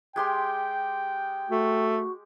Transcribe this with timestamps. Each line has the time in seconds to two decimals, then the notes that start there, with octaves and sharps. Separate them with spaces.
0.16 G#3 G4 G5 C6
1.50 A3 F#4